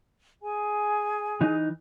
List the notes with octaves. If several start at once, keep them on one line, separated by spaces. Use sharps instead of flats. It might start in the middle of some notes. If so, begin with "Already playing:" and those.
G#4 G#5
E3 D#4